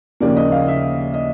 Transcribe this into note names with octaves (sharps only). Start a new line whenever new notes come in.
D#2 C#3 F3 A#3 D5
D#5
F5
E5
D#5